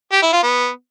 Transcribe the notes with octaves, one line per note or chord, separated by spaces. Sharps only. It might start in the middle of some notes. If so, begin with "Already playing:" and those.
G4
E4
F4
B3